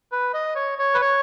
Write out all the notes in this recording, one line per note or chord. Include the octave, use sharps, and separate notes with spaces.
B4
D#5
C#5
C#5
B4
C#5